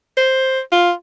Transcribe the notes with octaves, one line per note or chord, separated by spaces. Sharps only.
C5
F4